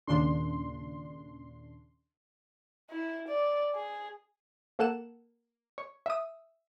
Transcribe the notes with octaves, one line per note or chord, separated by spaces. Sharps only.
D#2 A#2 C#3 D4 C6
E4
D5
G#4
A#3 A4 F#5 E7
C#5
E5 D#6